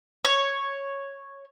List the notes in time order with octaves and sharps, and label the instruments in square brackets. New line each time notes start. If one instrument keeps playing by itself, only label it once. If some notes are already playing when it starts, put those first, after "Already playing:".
[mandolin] C#5